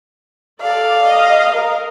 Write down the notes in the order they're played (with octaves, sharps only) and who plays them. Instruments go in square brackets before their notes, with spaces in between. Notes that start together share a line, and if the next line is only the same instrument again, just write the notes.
[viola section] A4 D5 [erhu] F5
[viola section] D#5
A#4